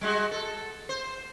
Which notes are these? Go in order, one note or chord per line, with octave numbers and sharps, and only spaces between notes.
G3 G#3 F#4
A4
C5